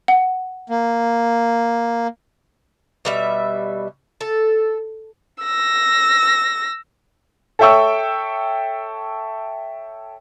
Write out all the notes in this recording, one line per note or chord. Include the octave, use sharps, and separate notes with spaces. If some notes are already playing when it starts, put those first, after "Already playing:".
F#5
A#3
B2 G3 E5
A4
E6 A#6
A4 C#5 E5 G5 C#6 E6